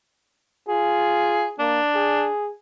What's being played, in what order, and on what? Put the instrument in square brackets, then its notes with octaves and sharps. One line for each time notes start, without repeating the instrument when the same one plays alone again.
[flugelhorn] F4 [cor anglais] G#4
[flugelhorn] A#3 [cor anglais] D4
[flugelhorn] G#4